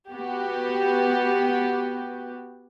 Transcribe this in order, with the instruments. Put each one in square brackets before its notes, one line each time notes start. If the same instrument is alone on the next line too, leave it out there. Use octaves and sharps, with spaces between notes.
[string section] B3 F#4 G4